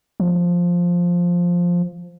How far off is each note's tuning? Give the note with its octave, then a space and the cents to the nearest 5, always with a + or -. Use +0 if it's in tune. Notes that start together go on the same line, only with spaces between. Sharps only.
F3 +5